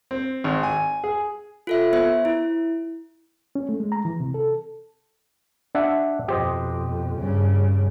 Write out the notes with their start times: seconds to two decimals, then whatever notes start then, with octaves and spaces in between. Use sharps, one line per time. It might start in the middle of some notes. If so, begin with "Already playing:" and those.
0.11 C4
0.44 G#1
0.63 G#5
1.04 G#4
1.67 F4 A4 E5
1.93 B3 C5 E5
2.25 E4
3.55 C#4
3.69 A3
3.80 G#3
3.92 A#5
4.05 E3
4.20 C3
4.34 A4
5.75 D4 E5 F#5
6.28 F2 B2 G4 C5 D#5
7.17 G2 C#3